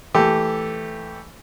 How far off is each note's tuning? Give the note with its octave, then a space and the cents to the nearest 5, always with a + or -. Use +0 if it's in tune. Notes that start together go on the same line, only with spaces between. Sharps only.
E3 +0 A3 +0 G4 +0